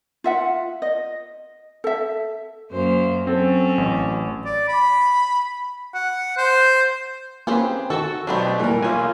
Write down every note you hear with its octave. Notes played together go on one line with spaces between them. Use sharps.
F4 E5 F#5
D#5
A4 E5
F#2 A#3 C5
F#3 C4 C#4 A4
A1
D5
B5
F#5
C5
A#3 C4 C#4 G4 G#4 B4
D#3 F#4 A4 C#6 E6
B2 F#3 A3 B3 C4 D4 G4
A#2 E3 G3 A3 A#4
B1 A#3 F4 G#4 C#5 G#5